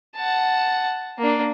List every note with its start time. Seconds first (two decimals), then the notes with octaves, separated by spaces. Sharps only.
0.16 F#5 A5
1.19 A#3 D4